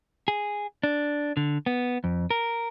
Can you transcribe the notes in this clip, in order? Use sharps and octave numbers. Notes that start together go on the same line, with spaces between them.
G#4
D4
D3
B3
F2
A#4